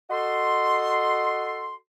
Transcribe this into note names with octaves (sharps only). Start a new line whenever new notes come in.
F#4 A4 D#5 C6